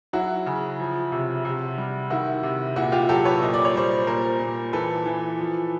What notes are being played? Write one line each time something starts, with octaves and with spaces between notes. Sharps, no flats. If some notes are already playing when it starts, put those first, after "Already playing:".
F#3 E4 F#4
C#3
F3
C3
C3
G3
D#3 E4 F#4
C3
A#2 E4 F#4
F4 G4
F#3 G4 A4
B4 C#5
A#2 D#5
D5
C#5
G3 C5 D5
A#2 A#4 C5
A#2
E3 A4 B4
E3
F3